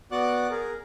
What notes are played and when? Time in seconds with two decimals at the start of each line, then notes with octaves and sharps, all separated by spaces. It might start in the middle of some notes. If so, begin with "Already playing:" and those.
0.12 B3 F#4 D5 F#5 D6 F#6
0.50 G#4 A#4